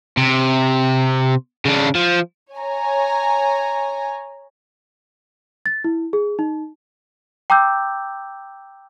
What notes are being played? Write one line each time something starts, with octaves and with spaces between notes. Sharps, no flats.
C3
C#3 D4
F3
C#5 G#5 A#5
A6
E4
G#4
D#4
G5 A#5 D6 E6 G6